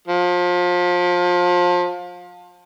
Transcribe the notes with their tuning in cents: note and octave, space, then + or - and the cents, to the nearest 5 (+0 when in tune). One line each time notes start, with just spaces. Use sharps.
F3 +30